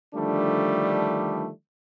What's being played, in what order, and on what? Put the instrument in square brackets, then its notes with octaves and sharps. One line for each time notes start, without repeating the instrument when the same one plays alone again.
[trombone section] D3 D#3 F3 G3 A3 D4